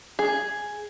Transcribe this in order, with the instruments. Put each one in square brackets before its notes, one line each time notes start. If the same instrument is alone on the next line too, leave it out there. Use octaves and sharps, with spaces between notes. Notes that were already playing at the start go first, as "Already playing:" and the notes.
[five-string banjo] G#4